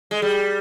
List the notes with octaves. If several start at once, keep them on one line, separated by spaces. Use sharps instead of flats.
G#3
G3